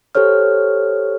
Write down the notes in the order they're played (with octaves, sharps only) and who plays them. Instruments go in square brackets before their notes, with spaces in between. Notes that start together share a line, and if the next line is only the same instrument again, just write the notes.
[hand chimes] G4 A4 C5 C#5 F6